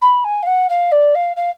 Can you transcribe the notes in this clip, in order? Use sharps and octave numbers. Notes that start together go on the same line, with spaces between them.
B5
G#5
F5
F#5
F5
D5
F5
F5